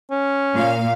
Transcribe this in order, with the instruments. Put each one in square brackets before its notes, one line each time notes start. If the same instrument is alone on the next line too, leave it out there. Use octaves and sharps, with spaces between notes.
[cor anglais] C#4
[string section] A#2 F5